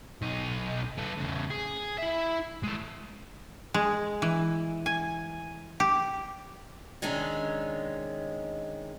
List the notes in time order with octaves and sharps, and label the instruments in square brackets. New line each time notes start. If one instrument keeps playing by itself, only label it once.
[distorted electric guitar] B1 D#4
B3 A4
E2 C#3
G#4
E4 E5
G#3 A4
[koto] G#3
E3
G#5
G4
[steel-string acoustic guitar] C3 D#3 G#3 C#4 D4